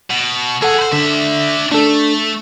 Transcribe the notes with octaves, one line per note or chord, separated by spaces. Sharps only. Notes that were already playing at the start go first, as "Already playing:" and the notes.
B2
E2 G#4 A4 F#5
B4 C5
D3 D4 E5
A3 D4 A4